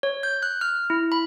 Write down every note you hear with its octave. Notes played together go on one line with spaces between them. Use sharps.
C#5
G6
F#6
F6
E4
B5